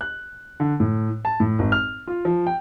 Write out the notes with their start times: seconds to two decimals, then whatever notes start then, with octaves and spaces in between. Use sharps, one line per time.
0.01 F#6
0.60 D3
0.80 A2
1.25 A5
1.40 A2
1.59 G#1
1.72 F6
2.07 F4
2.25 F3
2.47 G5